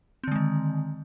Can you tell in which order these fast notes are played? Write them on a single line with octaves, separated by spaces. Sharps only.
C4 D3 G#3 D#3